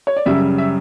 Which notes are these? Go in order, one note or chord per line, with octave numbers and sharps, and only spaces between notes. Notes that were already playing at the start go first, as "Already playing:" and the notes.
C#5
D5
F#2 C#3 G3 E5
E5